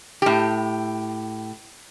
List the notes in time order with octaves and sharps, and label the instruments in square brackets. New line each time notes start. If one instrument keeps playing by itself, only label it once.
[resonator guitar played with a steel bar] A2 G4